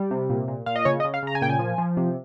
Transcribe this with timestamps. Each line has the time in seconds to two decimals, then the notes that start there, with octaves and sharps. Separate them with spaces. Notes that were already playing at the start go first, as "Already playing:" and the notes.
Already playing: G3
0.11 C3
0.30 A#2
0.48 A#2
0.66 A#2 F5
0.76 D#5
0.85 C#3 C#5
1.00 D#5
1.05 C#3
1.14 F5
1.23 C#3 A#5
1.35 G#5
1.41 A#2 G5
1.49 G#5
1.59 F3
1.78 F3
1.97 C3